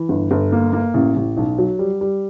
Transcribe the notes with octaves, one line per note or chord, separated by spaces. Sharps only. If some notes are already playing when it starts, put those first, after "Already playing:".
Already playing: E3
G1
G1
A#3
A#3
A1
A1
B1
F#3
G3
G3